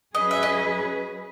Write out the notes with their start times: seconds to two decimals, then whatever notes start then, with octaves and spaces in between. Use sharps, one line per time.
0.14 F#3 C#4 G#4 B4 D#5
0.31 E5
0.43 D#5